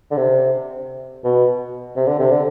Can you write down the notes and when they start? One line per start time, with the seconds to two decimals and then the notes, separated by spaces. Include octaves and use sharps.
0.11 D3
0.17 C3
1.24 B2
1.96 C3
2.07 D3
2.20 C3
2.31 D3